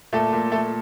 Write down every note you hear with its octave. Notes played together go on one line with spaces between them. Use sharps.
A#2 A3 A4
A#2
A3 A4